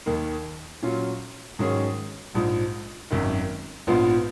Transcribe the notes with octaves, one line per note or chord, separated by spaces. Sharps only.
D#2 D#3 A#3
A#2 F#3 C#4 F4
G#2 D#3 F#3 C#4 G#4
A#1 G#2 F3
G#1 F#2 D#3
A#1 G#2 F3 B3 F4